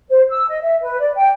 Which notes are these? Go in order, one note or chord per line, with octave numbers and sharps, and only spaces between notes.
C5
E6
D#5
E5
B4
D5
G5